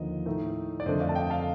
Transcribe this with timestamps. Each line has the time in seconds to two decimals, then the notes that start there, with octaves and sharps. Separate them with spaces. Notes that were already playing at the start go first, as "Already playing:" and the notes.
Already playing: D#2 D3 F3 D#5
0.26 A2 A3 D#4
0.80 D5
0.86 F2 D3 A3 D4 C5 D#5
1.00 D5 F5
1.09 A5
1.15 D#5 G5
1.30 F5 A5